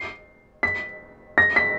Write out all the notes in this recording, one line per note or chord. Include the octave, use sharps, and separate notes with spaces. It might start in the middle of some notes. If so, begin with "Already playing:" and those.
Already playing: C7
B6
A#6
B6